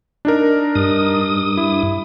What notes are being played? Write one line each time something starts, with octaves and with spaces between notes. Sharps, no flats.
D4 D#4 A#4
G2 D#6
E4